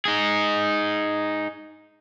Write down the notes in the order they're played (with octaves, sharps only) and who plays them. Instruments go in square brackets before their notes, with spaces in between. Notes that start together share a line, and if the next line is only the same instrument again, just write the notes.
[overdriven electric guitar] D#4 G#4